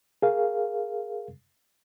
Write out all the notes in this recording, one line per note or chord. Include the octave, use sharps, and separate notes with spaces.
G#4 A#4 F5